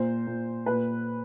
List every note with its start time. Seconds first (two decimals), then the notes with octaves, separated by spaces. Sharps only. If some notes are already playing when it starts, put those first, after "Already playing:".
Already playing: A#2 C5
0.27 A#2
0.66 A#2 B4